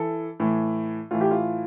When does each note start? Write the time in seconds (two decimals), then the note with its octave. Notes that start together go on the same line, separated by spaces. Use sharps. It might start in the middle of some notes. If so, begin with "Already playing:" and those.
Already playing: E3 A4
0.40 A2 E3
1.11 A2 E3 F4
1.21 G4
1.31 F4